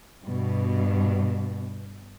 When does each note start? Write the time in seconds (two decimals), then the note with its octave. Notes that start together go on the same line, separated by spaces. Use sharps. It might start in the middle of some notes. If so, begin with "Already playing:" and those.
0.24 G2 B2